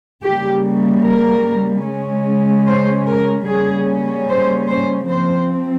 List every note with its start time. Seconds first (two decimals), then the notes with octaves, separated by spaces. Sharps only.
0.24 C#3 G3 A#3 G4
1.05 A#4
1.86 C#3 G#3 C#4
2.67 C5
3.07 A#4
3.47 C#3 G3 A#3 C#4 G#4
4.28 C5
4.69 C5
5.09 F3 C4 C5